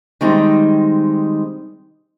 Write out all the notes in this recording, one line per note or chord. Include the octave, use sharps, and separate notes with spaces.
D#3 G3 G#3 C4 D#4